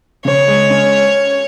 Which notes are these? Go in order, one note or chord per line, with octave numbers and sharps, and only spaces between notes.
C#3 C#5
G#3
C#4